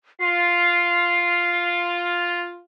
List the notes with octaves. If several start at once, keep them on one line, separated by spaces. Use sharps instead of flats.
F4 C7